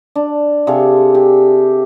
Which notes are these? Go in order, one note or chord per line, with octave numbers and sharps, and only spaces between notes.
D4
C3 G#4 A4 F5
G4